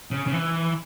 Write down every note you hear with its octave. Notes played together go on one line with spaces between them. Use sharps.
C#3
C#3
E3